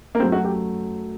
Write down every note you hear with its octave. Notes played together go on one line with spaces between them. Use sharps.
A#3
F#2 F#3 A3 C4
F#4
G4